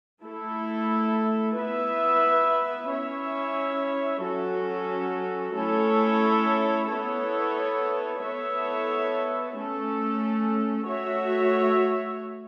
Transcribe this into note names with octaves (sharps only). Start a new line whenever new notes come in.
A3 E4 A4
B3 E4 B4 E5
C#4 E4 C#5 E5
F#3 C#4 F#4 A4
A3 C#4 E4 A4 C#5
B3 E4 A4 C#5
B3 E4 A4 C#5 E5
A3 C#4 A4
A3 F#4 C#5 E5